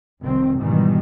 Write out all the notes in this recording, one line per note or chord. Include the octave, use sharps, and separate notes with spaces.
F1 C2 D#3 C4
G#2 B2 D#3 E3 G3